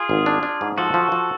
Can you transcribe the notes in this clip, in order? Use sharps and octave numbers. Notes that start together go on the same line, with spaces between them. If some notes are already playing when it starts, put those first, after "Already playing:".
Already playing: F4 G#4
G#1
D4
D4
G#2
F3 F#4 A4
F3
F3